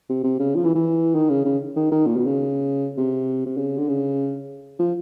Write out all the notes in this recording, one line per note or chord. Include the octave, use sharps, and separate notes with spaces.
C3
C3
C#3
F3
E3
E3
D#3
C#3
C#3
D#3
D#3
A#2
B2
C#3
C3
C3
C#3
D3
C#3
F3